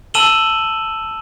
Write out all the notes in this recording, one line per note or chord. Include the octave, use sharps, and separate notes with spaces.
A5 E6 D#7 E7 F#7 G7